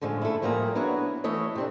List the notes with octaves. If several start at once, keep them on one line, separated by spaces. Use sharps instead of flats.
A2 D3 F3 G#3
A3 E4
A2 F3 G3 A#3 G#4 A#5
B3 D4 E4 F#4 C#5
E3 A3 E4 C#5 D#5
C3 C4 D4